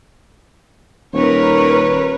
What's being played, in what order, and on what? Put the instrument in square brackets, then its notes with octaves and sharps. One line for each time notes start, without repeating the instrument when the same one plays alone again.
[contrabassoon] D#1 [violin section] A#4 B4 C#5